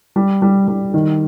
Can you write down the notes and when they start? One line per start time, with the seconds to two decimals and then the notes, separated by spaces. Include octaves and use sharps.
0.16 G3
0.42 G3
0.68 G3
0.94 D#3